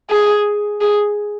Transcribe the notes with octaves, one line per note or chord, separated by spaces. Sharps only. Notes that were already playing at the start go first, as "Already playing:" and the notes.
G#4
G#4